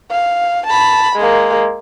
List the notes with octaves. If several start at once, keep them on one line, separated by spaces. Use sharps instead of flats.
F5
A5 B5
G#3 A#3